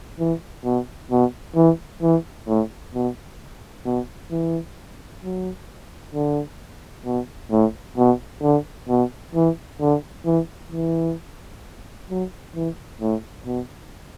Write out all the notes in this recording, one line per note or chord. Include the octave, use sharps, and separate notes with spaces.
E3
B2
B2
E3
E3
A2
B2
B2
E3
F#3
D3
B2
A2
B2
D3
B2
E3
D3
E3
E3
F#3
E3
A2
B2